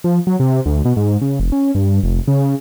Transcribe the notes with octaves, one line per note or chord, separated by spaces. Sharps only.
F3
F#3
C3
D2
B2
G#2
C#3
F1
C#4
G2
F1
C#3